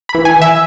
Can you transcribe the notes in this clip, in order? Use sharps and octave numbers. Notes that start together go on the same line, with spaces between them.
B5
E3
G#5
E3
E5